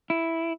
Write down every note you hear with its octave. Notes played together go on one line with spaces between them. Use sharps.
E4